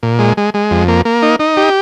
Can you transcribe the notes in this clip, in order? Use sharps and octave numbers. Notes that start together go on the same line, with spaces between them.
A#2
G#3
G#3
G#3
F2
A#3
A#3
D#4
D#4
G4